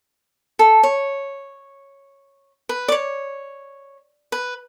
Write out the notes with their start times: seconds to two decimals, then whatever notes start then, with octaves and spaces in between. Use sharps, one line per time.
0.59 A4
0.83 C#5
2.69 B4
2.88 D5
2.92 C#5
4.32 B4